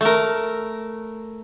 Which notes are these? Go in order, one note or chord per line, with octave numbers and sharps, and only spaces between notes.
A3 A#4